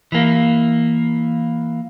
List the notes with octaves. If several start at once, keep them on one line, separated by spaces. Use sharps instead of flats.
E3 A#3